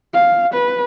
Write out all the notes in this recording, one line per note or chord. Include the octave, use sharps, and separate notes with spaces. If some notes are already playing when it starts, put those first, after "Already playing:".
F5
B4